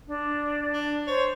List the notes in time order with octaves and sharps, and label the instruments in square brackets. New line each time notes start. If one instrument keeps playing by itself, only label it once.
[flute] D4
[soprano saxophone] D4
[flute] C5 [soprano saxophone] C#5